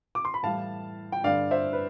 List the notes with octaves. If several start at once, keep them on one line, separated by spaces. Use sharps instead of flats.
D6
C6
B5
A2 E3 G3 F5 A5
G5
G2 D3 G3 D5 F5
C5 E5
B4